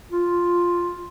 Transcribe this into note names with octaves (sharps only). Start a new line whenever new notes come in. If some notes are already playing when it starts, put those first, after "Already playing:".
F4